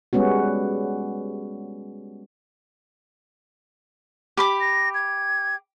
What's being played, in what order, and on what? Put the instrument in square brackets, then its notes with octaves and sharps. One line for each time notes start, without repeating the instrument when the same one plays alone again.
[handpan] G3 G#3 B3 C#4 F#4
[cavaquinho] G4 B5 D6
[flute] A#6
G#6